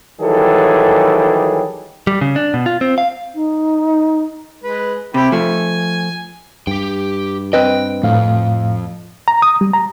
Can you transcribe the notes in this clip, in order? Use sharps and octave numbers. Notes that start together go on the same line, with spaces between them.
D#3 E3 F#3 G3 G#4 A4
G3
C#3
D4
B2
F4
C4
F5
D#4
G#3 B4
C3 E4 G4 B5
F3 A3 G#5
G2 G4 G5
C4 B4 D#5 G5
F2 A2 F5
A#5
D#6
G3
A#5